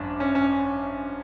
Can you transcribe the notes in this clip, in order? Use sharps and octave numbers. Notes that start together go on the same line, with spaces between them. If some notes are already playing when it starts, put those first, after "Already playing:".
Already playing: G#1 F#2 D4
C#4
C#4